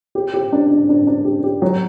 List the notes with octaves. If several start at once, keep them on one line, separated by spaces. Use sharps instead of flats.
G4
G4
D4
D4
D4
D4
G4
G4
F#3